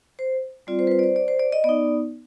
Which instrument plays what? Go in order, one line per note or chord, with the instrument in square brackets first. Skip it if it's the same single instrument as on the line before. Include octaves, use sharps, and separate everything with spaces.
[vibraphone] C5
G3 C4 F4 D5
C5
B4
C5
D5
C5
D5
C5
D5
D#5
B3 D#4 D5